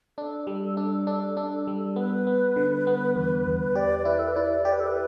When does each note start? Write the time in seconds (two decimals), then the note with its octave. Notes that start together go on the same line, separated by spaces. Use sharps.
0.18 D4 A4
0.47 G3
0.77 D4
1.07 D4
1.37 D4
1.67 G3
1.90 A4
1.96 B3 B4
2.27 B3
2.56 D3
2.87 B3
3.16 E2
3.46 E2
3.75 G4 D5
3.99 D5
4.05 E4 B4
4.19 A4
4.27 B4
4.36 E4 D5
4.65 G4 D5
4.73 B4
4.80 A4
4.87 B4